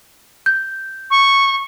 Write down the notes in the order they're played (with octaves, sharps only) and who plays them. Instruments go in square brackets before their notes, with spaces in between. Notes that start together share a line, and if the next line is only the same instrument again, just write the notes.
[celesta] G6
[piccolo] C#6